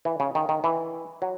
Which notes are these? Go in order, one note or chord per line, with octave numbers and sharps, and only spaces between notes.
E3
C#3
D#3
D#3
E3
F#3